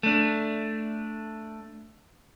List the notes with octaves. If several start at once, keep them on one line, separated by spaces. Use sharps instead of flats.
A3 D4